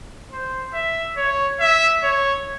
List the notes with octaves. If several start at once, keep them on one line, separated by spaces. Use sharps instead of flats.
C5
E5
C#5
E5
C#5